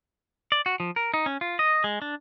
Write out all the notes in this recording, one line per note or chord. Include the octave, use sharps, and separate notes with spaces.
D5
F#4
F3
A#4
D#4
C#4
F4
D#5
G#3
D4